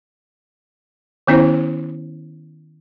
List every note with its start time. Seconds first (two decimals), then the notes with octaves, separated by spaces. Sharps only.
1.27 D#3 B3 C#4 E4 C5